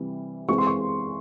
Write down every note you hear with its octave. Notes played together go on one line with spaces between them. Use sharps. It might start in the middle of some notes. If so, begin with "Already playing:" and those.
Already playing: C3 E3 G3
E3 G#3 C4 C#6
C6
C#6